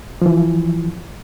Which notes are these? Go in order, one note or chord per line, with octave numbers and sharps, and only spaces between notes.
E3 F3